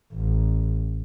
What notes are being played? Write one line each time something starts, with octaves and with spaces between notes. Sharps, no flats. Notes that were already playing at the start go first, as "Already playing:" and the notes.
A1